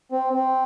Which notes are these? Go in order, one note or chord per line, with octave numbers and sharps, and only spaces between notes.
C4
C4